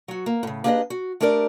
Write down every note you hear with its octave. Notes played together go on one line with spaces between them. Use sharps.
F#3 F#4
A#3
A2 C#3
A#3 D4 G4 G#4 B4 D#5
F#4
A3 D4 G4 A#4 D5